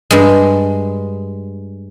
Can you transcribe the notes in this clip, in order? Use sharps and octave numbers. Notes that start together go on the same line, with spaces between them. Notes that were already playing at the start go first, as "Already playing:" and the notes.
G2 G#3